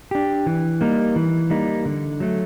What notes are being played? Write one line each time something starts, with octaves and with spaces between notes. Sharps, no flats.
D4 G4
E3
G3 A#3 D#4
E3
G3 A#3 D#4
D3
F#3 A3